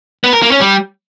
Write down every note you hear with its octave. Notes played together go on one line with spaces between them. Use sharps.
B3
A#4
A#3
C#4
G3